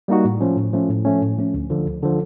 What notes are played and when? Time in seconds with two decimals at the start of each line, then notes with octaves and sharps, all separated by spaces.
0.08 G3 A#3 D#4 F#4
0.25 A2
0.41 F3 A3 C#4
0.57 A2
0.73 F3 A3 C#4
0.90 A2
1.05 F3 A3 C#4
1.21 A2
1.38 F3 A3 C#4
1.54 D2
1.70 D3 F3
1.86 D2
2.02 D3 F3